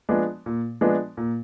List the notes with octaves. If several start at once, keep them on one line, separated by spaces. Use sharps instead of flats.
F3 G#3 B3 D4
A#2
F3 G#3 B3 D4
A#2